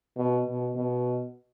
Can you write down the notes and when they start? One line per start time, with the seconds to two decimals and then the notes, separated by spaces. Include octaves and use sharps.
0.17 B2
0.46 B2
0.75 B2